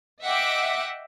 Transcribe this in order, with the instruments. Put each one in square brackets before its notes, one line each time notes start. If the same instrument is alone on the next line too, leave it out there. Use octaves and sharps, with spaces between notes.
[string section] D#5 E5 F#5 G5 D6